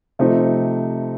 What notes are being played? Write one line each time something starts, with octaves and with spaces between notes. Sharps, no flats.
C3 F3 A3 C4 D#4